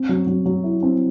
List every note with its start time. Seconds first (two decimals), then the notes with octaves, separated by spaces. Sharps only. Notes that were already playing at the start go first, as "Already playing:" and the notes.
Already playing: C4
0.09 F#3
0.27 F#3
0.46 F#3
0.64 E4
0.83 C4